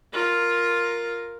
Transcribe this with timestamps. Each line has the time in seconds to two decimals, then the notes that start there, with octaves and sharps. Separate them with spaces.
0.12 F4 A#4